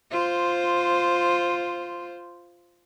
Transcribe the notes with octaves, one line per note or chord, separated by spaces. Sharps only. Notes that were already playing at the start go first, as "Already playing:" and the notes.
F4 C5